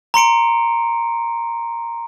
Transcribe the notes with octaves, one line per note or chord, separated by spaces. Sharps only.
A#5 C6 C#7 D7